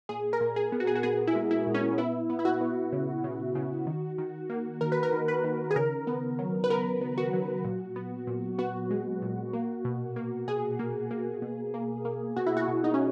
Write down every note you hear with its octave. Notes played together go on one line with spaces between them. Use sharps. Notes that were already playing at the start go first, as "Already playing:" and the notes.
A#2 G#4
A#4
A#2
G#4
B3
F#4
G#4
F#4
B3 G#4
E4
G#3
E4
A#2
C#4
B3 E4
B3
E4
F#4
B3
C#3
C#3
C#3
D#3
D#3
A#3
D#3 A#4
B4
A#4
D#3
B4
D#3
G#4
C#3 A#4
B3
F#3
B4
B3 A#4
B3
F#4
F#3
A#2
B3
A#2
B3 F#4
G#3
A#2
A#3
B2
A#3
B2 G#4
A#3
A#3
B2
A#3
A#3
B2 F#4
E4
F#4
B2
D#4
C#4